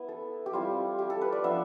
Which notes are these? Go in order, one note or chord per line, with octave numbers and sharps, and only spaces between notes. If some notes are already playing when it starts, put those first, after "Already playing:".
Already playing: B3 E4
A4
G4
G3 C4 E4 F4
G4
A4
B4
D5
F3 B3 D4 E5